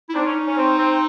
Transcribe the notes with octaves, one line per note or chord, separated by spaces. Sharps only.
E4
C4 D4 D#4
C#4
C#4
C4
C4